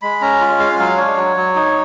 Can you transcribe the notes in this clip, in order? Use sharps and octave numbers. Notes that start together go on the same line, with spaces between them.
G#3 B5
C#4 A#5
F4
G#3 F5
F#3 F5
D4 C#5
F#3
F#3
D#4